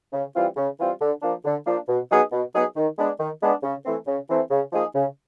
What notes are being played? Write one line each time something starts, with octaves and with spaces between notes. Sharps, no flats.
C#3
E3 G3 C4 F4
C#3
E3 G3 C4 F4
D3
F3 A#3 D4
D3
F3 A#3 D4
B2
F#3 B3 D#4 G#4
B2
F#3 B3 D#4 G#4
D#3
G#3 B3 D4
D#3
G#3 B3 D4
C#3
E3 A3 C4
C#3
E3 A3 C4
C#3
F3 A#3 D#4 G#4
C#3